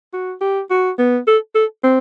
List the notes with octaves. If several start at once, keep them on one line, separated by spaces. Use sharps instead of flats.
F#4
G4
F#4
B3
A4
A4
C4